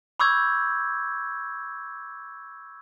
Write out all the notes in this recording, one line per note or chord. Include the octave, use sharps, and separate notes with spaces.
B5 C#6 D6 E6 G6 G#6